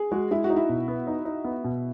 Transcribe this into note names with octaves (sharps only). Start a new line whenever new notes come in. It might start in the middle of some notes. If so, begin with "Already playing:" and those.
Already playing: G#4
G#3 F#4
G#3 E4
F#4
D#4
E4
B2
B3
D#4
D#4
B3
B2